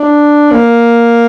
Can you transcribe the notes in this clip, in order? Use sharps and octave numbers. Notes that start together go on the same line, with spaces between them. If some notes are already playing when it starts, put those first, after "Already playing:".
Already playing: D4
A#3